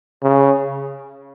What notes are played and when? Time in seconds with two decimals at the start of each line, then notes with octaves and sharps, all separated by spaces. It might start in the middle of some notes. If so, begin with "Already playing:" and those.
0.23 C#3